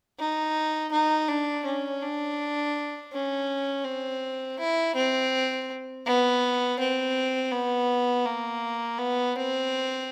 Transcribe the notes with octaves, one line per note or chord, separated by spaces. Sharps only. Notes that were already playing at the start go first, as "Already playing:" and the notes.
D#4
D#4
D4
C#4
D4
C#4
C4
E4
C4
B3
C4
B3
A#3
B3
C4